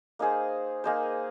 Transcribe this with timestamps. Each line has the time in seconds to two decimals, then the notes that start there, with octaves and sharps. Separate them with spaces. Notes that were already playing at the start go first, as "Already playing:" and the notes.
0.19 A#3 D#4 G#4 C5
0.84 A#3 D#4 G#4 C5